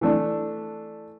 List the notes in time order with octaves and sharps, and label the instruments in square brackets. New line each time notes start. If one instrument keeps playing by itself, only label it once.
[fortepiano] E3 A3 D4